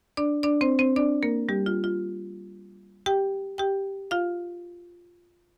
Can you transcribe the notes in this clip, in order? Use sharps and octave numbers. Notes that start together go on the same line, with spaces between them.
D4 D5
D4 D5
C4 C5
C4 C5
D4 D5
A#3 A#4
G3 G4
F4
F4
G4 G5
G4 G5
F4 F5